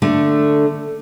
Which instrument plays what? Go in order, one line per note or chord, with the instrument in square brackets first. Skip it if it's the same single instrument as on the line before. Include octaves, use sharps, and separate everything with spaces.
[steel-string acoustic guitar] D3 A3